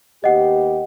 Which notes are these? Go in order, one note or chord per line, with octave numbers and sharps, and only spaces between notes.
D#2 B3 G4 D#5 F#5